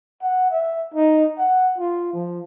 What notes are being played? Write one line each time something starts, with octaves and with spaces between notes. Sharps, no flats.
F#5
E5
D#4
F#5
F4
F3